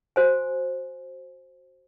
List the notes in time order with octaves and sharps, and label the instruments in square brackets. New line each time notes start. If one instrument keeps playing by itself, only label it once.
[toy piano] F#4 C5 G#5